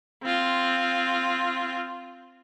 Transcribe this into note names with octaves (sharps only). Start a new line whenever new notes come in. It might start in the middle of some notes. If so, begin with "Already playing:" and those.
C4 F4